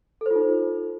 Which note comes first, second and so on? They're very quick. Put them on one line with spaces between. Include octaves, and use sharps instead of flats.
A4 C5 F4 D#4